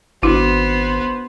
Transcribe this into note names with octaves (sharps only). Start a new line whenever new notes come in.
G#1 B3 D4 E4 F#4 C5